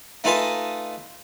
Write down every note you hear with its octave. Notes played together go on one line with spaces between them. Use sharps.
A3 D#4 F4 B4 G#5 A5